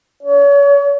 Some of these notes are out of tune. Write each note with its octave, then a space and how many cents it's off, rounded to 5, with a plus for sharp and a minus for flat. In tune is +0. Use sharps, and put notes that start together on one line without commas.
C#5 +35